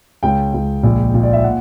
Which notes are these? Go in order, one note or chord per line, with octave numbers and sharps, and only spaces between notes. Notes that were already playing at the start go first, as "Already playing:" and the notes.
C#2 G5
C#2
A#1
A#2
D5
E5
F#5